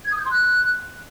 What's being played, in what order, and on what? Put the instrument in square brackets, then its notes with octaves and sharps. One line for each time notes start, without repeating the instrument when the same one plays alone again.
[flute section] G#6
D#6
G6
C6
F#6